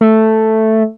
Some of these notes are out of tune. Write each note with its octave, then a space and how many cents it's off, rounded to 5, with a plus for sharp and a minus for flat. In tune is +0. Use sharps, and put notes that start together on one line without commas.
A3 +0